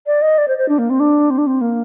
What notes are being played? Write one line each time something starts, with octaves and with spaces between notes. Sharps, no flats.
D5
D#5
D5
C5
C5
D4
A#3
C4
D4
C4
D4
C4
A#3